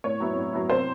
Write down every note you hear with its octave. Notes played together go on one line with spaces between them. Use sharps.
A2 C#5
F#3 B3 E4
A2
F#3 B3 E4
C3 C5